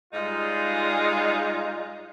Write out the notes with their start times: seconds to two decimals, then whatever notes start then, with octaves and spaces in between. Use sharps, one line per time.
0.14 G#2 G3 G#3 D#4 F4